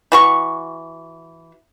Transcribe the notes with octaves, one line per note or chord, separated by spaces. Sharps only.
E3 F#4 C#6